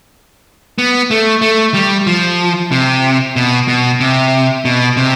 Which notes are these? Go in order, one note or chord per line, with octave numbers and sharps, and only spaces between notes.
B3
A3
A3
G3
F3
C3
B2
B2
C3
B2
C3